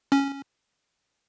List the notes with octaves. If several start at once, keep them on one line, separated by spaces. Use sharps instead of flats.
C#4